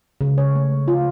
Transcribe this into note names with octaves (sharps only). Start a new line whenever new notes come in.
C#3
C#5
A3
F4